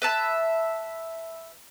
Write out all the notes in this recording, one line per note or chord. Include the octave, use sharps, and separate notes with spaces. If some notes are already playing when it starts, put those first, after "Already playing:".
B4 E5 A5 B5